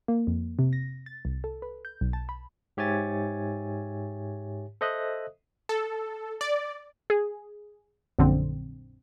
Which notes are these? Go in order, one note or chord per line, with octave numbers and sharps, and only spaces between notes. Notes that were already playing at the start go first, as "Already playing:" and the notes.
A#3
F2
C3
A#6
A6
C2
A4
B4
G6
B1
A5
B5
G#2 G4 C#5 E5 G#5 A6
A4 C5 D#5 E5 D#6 F#6
A4
D5
G#4
A#1 F#2 D3 C4